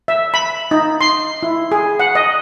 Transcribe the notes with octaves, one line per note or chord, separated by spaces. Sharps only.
E5
B5
D#4
C6
E4
G#4
F#5
D#5